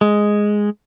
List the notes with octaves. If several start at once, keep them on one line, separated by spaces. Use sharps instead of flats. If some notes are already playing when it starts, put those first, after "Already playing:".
G#3